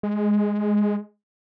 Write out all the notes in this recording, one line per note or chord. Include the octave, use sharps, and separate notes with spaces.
G#3